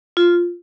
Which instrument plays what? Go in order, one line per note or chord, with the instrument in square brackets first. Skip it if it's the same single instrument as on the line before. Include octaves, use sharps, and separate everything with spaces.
[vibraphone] F4